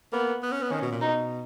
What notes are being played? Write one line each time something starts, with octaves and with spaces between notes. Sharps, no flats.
A#3 B3
B3
C#4
B3
D#3 C#4
B2
A#2
B2 D#4